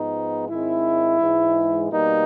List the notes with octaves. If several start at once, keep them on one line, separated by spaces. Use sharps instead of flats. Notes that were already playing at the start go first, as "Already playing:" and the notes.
Already playing: G#2 F3 G#3 B3 D#4
G#2 D#3 G#3 C4 E4
G#2 E3 G#3
B2 G3 A#3 D#4